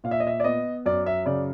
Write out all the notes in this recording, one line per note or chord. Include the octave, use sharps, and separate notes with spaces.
A#2 F5
E5
D#5
E5
D5
B3 D#5
F#2 D5
E5
C#3 D5